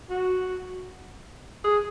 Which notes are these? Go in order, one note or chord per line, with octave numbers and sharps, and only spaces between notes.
F#4
G#4